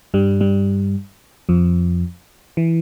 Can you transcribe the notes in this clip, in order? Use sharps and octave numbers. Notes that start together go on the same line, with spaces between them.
G2 G3
G2 G3
F2 F3
E3